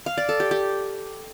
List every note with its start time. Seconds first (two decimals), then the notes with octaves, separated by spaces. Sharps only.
0.06 F5
0.18 D5
0.29 A4
0.40 G4
0.51 G4